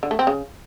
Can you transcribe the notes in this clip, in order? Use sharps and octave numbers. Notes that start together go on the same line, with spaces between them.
D3
A3
C4
C#3